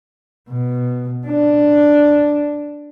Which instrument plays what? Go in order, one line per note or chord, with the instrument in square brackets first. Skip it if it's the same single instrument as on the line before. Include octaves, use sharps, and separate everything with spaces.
[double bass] B2
D4